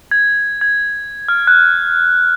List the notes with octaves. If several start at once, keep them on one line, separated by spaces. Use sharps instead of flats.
G#6
G#6
F6
F#6